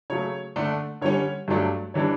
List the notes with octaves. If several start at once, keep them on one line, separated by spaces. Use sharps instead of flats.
C#3 F#3 A3 C#5
D3 A3 D4
D3 G3 C#4 C#5
G2 F#3 A3 D4
E3 G3 D4 C#5